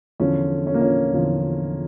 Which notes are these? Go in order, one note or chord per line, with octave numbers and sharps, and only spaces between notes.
E2 D3 F3 C#4
C#4
A#3
C#4
E2 D3 F3